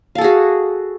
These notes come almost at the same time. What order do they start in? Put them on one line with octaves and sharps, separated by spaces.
F5 A4 G#4 F#4